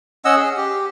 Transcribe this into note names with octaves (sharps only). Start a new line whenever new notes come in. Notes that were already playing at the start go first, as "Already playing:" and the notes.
C#4 D#5 F#5 E6
G#4
G4